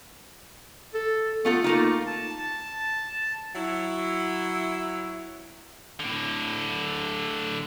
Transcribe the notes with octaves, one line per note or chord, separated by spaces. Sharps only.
A4
A3 B3 F4 A4
A3 A#3 D#4 F4
A5
F#3 E4
A2 D3